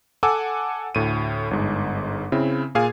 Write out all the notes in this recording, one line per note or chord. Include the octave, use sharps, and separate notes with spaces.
A4 F#5 G#5 D6 E6
D2 A2 D#7
G1 G#2
C#3 C4 E4
A#2 G#4 F5 G#5 G#6